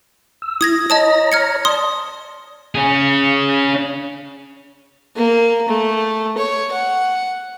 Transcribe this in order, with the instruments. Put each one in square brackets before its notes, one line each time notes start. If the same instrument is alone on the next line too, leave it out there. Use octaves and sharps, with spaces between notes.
[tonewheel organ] E6
[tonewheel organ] E4 [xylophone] D#6 G#6 A#6
[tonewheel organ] C#5 A#5 A#6 [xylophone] D#5 A5 D#6
[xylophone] F6 G#6 C#7
[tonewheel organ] D5 A5 [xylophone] C6 D#6
[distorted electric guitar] C#4 G#4
[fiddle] A#3
A3
C#5
F#5